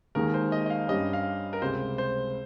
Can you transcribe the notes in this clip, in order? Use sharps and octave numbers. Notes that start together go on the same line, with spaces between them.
D#2 D#3 G#3 A#4
C5
D#5
D#5
F5
G2 G3 C#4 D#5
F5
A#4
C#2 C3 G3 C5
C5